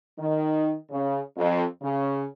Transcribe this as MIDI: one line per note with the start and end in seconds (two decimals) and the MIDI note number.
0.19 0.75 51
0.90 1.19 49
1.37 1.64 41
1.82 2.25 49